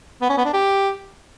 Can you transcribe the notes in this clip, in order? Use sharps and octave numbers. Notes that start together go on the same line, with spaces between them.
B3
C#4
B3
D4
G4